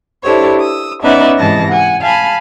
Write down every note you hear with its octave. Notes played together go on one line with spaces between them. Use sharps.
D4 E4 G4 A4 C5 C#5
D#6 E6
B3 C#4 D#4 B4 D5 E5
G#2 C3 E3 D#5 A5 A#6
F#5 G#5
F5 G#5 A5 B5